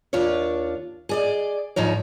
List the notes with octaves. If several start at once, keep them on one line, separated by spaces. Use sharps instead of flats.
D#2 D4 F4 C#5
G#4 D5 D#5
D2 G#2 F3 D#4 C#5